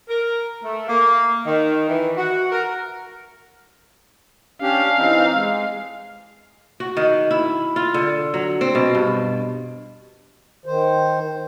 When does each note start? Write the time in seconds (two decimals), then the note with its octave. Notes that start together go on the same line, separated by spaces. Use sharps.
0.10 A#4
0.64 A3
0.88 A#3
1.46 D#3
1.89 E3
2.18 F#4
2.52 A#4
4.62 C#4 D4 G4 F5
4.97 E3 C4 D#4
5.36 G#3
6.80 F#4
6.97 D#3
7.31 E4
7.76 F4
7.94 D3
8.34 F#3
8.61 C4
8.75 B2
8.95 G2
10.66 D#3 C5